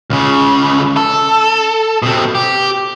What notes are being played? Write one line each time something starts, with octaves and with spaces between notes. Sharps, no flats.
C#2 C#3
A4
B2 C4
G4